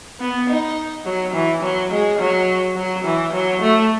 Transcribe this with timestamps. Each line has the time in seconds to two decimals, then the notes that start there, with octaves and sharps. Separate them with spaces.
0.20 B3
0.50 D#4
1.06 F#3
1.34 E3
1.63 F#3
1.92 G#3
2.19 F#3
2.76 F#3
3.05 E3
3.33 F#3
3.62 A3